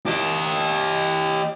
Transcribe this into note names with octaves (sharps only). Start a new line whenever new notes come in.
G4 D#5